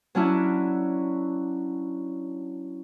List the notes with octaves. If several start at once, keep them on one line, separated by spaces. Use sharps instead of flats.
F#3 C#4 D4 E4